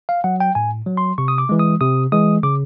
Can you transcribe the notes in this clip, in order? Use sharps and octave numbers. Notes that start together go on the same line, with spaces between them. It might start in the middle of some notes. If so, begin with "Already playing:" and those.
F5
F#3 F#5
G5
A2 G#5
F#3
C6
C3 C#6
D#6
D6
E3 G#3
D#6
C3 D#6
E3 G#3 D#6
C#3 D6